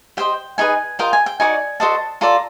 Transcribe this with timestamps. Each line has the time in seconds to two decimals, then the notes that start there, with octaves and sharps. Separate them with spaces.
0.17 G4 C5 D#5 G5
0.58 D#4 G#4 B4 G#5
0.99 F4 A#4 D#5 G5
1.13 G#5
1.26 G5
1.40 D#4 F#4 A#4 D5 G#5
1.80 F#4 A4 C5 D#5 A5
2.21 F4 A4 D5 A#5